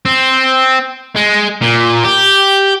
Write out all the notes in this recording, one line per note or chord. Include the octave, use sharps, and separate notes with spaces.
C4
G#3
A#2
G4